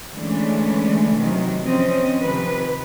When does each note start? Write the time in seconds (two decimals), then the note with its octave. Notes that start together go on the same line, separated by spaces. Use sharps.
0.13 D3 E3 G#3 A3 C#4 D4
1.16 C3 D#3 E3 F#3
1.63 F3 C4 C#4 D#5
2.22 C3 D#3 F3 B4